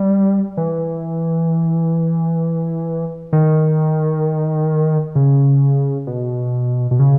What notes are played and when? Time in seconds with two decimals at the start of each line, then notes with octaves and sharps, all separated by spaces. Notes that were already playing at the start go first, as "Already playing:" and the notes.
Already playing: G3
0.57 E3
3.33 D#3
5.15 C#3
6.07 B2
6.91 B2
6.99 C#3